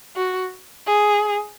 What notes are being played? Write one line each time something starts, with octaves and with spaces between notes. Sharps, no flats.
F#4
G#4